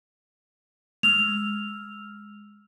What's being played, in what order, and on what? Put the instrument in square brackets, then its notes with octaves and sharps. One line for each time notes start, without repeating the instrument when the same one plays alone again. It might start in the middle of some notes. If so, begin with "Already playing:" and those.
[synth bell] G#3 E6 F6 [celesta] F7